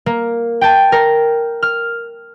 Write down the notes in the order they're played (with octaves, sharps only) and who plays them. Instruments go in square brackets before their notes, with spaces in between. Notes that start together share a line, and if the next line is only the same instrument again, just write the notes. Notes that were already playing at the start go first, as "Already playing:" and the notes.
[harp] A#3
G5 A5
A#4
F6